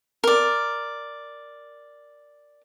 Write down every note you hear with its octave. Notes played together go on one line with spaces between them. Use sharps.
A#4 D5